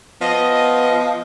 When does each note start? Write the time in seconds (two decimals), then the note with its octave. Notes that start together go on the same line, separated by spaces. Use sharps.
0.21 F3 B3 D#5